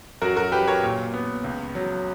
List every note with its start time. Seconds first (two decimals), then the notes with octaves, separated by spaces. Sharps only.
0.22 F#2 F#4 A#4
0.36 F#4 A#4
0.52 F#3 G4 B4
0.68 A#4 C#5
0.83 A#2
1.14 B3
1.44 C#2
1.75 F#3